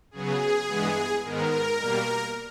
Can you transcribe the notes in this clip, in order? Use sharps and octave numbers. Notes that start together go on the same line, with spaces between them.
C#3 F#3 B3 G#4
G2 E3 G#3 B3
G#2 D#3 G#3 B3 A#4
B2 G3 A#3